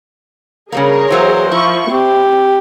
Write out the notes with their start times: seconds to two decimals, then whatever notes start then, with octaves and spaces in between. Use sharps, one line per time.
0.72 C#3 G3 A#3 G#4 A#4 C#5
1.10 E3 F#3 A#3 C5
1.52 F3 E4 C#6
1.91 C4 G4